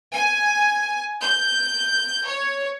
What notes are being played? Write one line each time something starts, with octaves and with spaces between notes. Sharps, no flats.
G#5
G6
C#5